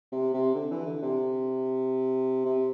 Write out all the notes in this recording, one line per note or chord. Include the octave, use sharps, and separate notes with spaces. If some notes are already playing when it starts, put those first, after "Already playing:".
C3
C3
D3
E3
D3
C3
C3